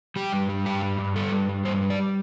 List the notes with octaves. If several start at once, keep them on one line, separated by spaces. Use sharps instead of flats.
G3 G4
G2
G3
G2 G4
G3
G2
G3 A4
G2
G3
G2 C5
G3
D5